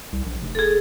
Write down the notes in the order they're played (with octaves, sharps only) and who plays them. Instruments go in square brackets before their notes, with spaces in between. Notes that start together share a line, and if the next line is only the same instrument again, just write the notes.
[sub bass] C2
A#1
F1
[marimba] G#4 A4